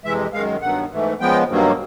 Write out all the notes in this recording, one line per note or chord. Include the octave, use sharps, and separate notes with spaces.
F2 C3 E3 G#3 E5
F#2 D#3 G#3 F5
G2 D#3 F#3 B3 F#5
G#2 E3 A3
C#3 F3 G#3 B3 G5
G2 D#3 F#3 A#3